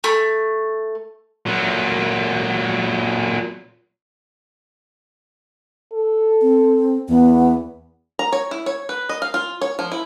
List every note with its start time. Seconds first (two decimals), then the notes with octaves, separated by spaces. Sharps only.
0.04 A3
1.46 A#2 F#3
5.93 A4
6.42 C4
7.09 E2 B3
8.19 A#5
8.32 C#5
8.51 E4
8.66 C#5
8.89 B4
9.09 D#5
9.22 F5
9.34 F4
9.61 C#5
9.79 F3
9.92 E4